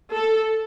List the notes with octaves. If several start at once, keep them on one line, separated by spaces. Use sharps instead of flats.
A4